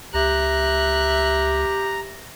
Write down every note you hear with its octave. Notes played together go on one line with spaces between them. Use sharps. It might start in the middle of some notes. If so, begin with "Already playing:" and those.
C#2 G4 E5 A#5 F#6